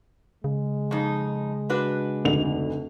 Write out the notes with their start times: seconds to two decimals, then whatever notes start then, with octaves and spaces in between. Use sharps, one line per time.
0.44 C#3 G#3
0.91 F2 D#4
1.69 D4 F#4 B4
2.25 F1 D2 F7